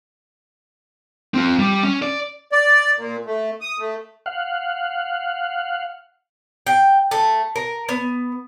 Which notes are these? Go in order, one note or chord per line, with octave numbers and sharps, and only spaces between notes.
C4 F4
G3
C#4
D5
D5
A#2
A3
D#6
A3
F5 F#5
G5
A3
A#4
B3